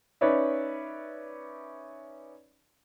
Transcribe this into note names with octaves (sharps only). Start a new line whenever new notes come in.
C#4 D#4 B4 C#5 D5 E5